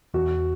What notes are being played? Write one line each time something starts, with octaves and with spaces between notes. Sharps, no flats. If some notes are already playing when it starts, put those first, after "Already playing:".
E2 F#4